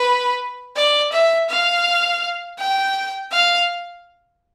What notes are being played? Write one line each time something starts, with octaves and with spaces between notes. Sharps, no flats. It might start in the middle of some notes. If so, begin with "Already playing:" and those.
Already playing: B4
D5
E5
F5
G5
F5